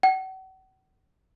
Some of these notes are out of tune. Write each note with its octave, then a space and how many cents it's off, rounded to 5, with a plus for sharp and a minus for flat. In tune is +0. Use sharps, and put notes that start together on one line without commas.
F#5 +40